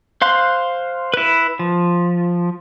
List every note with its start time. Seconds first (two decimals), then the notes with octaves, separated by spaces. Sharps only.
0.22 C5 F5 C6 F#6
1.14 E4 B4
1.59 F3